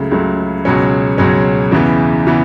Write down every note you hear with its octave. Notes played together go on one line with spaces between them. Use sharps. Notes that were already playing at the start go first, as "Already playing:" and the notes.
Already playing: C#2 C#3 F#3 A3
C#2 C#3 F#3 A3
C#2 B2 F#3 C#4
C#2 B2 F#3 C#4
E2 C#3 E3 B3
C#3 E3 B3